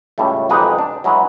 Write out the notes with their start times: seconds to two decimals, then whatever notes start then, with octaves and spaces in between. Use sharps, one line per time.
0.18 C#2 A2 G3 A3
0.49 B1 F2 G#3 D#4 G4 B4
0.78 D4
1.04 F#3 G#3 E4 F#4 B4